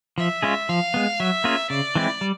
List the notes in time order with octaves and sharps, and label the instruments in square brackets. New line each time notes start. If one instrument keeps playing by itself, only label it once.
[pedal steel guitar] F3 [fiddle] E5
[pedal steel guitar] G#3 C#4 F4 G#4
[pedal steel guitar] F3 [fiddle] F5
[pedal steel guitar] G#3 B3
[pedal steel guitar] F#3 [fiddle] E5
[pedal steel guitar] A#3 C#4 F4 G#4
[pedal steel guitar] C#3 [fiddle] D5
[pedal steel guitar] E3 G#3 C4 E4
G3